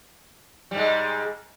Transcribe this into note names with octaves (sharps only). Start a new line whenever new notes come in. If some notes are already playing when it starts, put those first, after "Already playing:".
G#2 G3 G#3